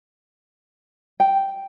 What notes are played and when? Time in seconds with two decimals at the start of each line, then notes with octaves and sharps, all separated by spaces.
1.20 G5